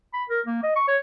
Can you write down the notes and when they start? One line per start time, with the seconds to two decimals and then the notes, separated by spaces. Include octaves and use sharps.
0.14 B5
0.29 A#4
0.46 A#3
0.63 D#5
0.76 C#6
0.88 C#5